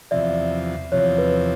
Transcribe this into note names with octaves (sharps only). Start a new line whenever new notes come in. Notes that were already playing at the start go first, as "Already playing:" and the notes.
E2 C3 F3 D5 E5
E2 C3 F3 C#5
B4